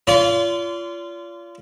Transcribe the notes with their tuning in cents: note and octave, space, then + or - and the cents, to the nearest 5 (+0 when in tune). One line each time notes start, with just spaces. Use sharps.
F4 -25 D5 -45 C6 -30